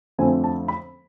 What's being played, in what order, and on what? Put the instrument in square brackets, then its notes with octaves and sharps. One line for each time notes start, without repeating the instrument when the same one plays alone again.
[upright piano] F2 D3 A3 C4 G#5
A5
B5